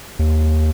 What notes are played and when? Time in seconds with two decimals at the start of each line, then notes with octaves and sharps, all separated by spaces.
0.19 D#2